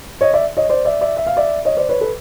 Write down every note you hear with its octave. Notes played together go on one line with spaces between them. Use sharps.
C#5 D#5
D5 E5
C#5 D#5
C5 D5
D5 E5
D5 E5
E5
F5
D5 E5
C#5 D#5
C5 D5
B4 C#5
A4 B4